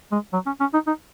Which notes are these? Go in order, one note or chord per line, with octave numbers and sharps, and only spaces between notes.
G#3
F#3
C#4
C#4
D#4
D#4